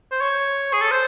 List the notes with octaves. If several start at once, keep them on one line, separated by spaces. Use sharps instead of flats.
C5
C#5
G#4
A4
C5